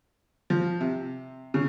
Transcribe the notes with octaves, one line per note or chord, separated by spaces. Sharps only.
F3
C3
C#3